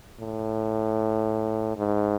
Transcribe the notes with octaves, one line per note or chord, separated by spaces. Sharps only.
A2
G#2